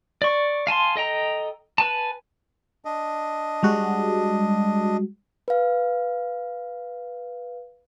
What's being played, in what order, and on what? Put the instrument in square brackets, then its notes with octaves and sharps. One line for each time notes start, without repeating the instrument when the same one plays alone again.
[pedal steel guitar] D5 C#6
F5 G#5 A5 C6
A4 D#5 G5 A#5
B4 G#5 A5
[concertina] D4 D#5
[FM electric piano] G3 G#3 F#4
[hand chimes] B4 F5